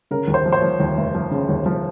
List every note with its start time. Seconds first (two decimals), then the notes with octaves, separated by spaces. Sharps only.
0.11 C#3 A#4
0.28 D#2
0.34 C5
0.46 F3
0.52 C5
0.57 C#5
0.62 F3
0.80 D#2
0.97 F1
1.15 F3
1.31 C#3
1.49 D#2
1.66 F3